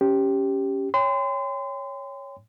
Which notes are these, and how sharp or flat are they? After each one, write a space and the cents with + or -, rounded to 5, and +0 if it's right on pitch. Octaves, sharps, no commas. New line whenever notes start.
C#4 +0 G4 +0
C#5 +0 G5 +35 C6 -35